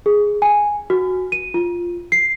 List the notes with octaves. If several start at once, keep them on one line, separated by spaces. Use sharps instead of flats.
G#4
G#5
F#4
D#7
F4
C7